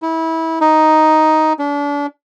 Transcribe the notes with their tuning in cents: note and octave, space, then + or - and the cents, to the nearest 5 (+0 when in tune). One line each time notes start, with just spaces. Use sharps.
E4 -25
D#4 +5
D4 -35